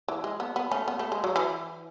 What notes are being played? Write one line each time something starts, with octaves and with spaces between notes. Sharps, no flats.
E3
G#3
B3
B3
A3 C#4
B3
A3
G#3
F#3
E3